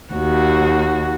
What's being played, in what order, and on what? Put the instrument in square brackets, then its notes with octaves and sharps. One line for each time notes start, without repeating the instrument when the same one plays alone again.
[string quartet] D#2 F#4